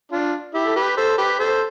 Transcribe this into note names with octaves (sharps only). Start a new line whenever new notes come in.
D4 F4
E4 G4
A4
G4 B4
A4 C5
G4 B4
A4 C5